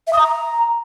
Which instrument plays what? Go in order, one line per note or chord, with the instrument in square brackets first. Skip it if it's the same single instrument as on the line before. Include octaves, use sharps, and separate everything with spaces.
[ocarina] E5
D#6
A#5